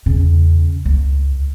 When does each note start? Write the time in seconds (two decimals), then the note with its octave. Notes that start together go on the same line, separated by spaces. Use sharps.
0.06 E2 C#3
0.85 C#2 A#3